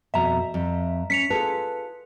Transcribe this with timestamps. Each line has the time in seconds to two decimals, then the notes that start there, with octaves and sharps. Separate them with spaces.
0.14 F2 B2 E5 A#5
0.54 F2
1.10 C#4 B6 C#7 F7
1.30 F4 G#4 A4 B4